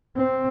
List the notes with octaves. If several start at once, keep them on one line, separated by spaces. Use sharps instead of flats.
C4